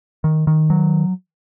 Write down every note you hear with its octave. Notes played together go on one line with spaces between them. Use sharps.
D#3
D#3
F#3